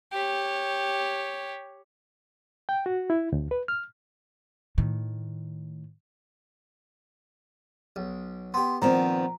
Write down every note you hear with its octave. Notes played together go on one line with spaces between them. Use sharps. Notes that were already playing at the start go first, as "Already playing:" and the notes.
G4 C#5
G5
F#4
E4
D2
B4
F6
A2 D#3
B1
B3 G4 C6
A#2 D#3 F3 B3 C4 A#5